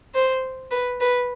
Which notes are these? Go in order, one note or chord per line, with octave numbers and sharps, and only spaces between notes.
C5
B4
B4